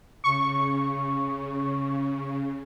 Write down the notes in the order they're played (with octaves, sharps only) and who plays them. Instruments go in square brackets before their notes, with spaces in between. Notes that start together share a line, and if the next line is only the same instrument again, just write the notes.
[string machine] C#3 [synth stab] C#6